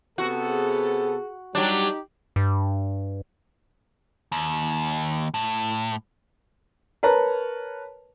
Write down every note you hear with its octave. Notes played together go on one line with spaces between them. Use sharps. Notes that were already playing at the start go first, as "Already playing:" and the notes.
C3 B3 F#4 A4
G#4
F#3 G3 D4 D#4 G4
G2
D#2
A2
A#4 B4 C#5 A5 A#5